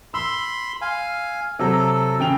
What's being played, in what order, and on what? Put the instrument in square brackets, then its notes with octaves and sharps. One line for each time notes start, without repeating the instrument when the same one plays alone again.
[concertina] B5 C6 [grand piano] E6
[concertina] F5 G#5
[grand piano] C3 F#3 [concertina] A4
[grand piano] C#3 G5 F7